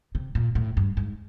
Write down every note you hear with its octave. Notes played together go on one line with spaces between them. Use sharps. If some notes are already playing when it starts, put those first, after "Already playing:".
C3
A#2
A2
G2
G#2